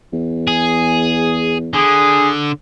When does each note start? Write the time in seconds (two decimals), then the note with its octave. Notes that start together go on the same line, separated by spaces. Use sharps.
0.13 E2
0.48 G#4
1.74 D3 G#4